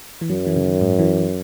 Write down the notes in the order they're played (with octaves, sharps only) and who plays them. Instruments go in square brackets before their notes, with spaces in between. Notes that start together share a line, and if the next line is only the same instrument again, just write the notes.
[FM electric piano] E3
[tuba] F#2 [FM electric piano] F#3
[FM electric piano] E3
C#3
D#3
G#2
E3